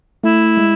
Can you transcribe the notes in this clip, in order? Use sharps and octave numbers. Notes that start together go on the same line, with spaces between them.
A3 E4
G#3